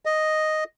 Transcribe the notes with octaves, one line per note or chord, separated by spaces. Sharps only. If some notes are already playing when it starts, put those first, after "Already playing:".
D#5